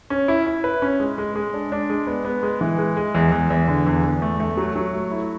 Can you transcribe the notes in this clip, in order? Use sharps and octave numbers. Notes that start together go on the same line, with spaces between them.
C#4
E4
E4
B4
C#4
G#3
G#3
G#3
D4
D4
G#3
B3
B3
G#3
E3
G#3
G#3
E2
E2
E2
D3
E2
E2
A3
A3
F#3
F#3
A3
E4